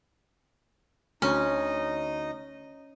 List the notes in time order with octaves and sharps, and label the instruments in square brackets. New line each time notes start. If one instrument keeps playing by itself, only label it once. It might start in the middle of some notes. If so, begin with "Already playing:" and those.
[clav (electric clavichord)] D2 [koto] C#4 [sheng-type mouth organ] D#4 D#5